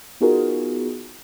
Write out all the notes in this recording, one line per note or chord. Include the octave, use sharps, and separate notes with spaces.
B3 D#4 F4 F#4 G#4 A#4